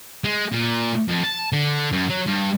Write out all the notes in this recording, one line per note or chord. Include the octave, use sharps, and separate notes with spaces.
G#3
A#2
F2
A5
D3
F#2
F#3
G2